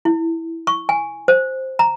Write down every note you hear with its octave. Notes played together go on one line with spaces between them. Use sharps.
E4
C#6
G#5
C5
A#5